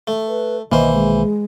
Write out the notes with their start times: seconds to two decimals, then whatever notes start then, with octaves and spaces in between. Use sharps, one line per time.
0.07 A3
0.28 B4
0.72 B1 D#3 E3 A#3 C5 D#5
0.93 G#3